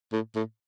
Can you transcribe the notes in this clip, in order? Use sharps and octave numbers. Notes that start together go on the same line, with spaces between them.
A2
A2